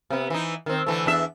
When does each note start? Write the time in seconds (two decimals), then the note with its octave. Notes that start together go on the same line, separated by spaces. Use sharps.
0.10 C3 B3
0.30 E3 D#4
0.66 D#3 C4
0.86 D3 E3 A3
1.06 E2 D4 E5